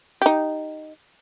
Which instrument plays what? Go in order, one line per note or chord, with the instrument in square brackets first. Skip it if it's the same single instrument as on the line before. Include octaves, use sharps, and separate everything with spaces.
[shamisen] D#4 G4